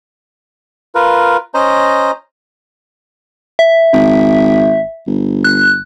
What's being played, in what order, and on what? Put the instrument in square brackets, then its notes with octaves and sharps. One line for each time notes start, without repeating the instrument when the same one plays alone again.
[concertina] F4 A#4 B4
C#4 C5 D#5 A#5
[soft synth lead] E5
[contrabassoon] G#1
G1
[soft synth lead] F#6